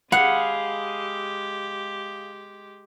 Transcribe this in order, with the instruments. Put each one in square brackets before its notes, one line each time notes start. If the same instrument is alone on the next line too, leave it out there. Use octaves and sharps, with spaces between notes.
[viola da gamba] G#3 G4 [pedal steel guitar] G#4 F5 B5 [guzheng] F#5